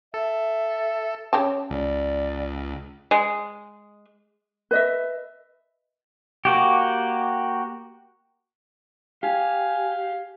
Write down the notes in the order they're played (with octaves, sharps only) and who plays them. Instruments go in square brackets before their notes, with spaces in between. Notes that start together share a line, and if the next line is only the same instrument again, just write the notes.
[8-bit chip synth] A4 [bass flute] E5
[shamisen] C#3 G4 A5 [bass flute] C#5
[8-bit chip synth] C#2 [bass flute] D5
[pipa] G#3
[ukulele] B4 D#5 E5
[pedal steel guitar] A#3 F#4 G4
[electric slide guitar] G4 [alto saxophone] F5 [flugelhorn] G#5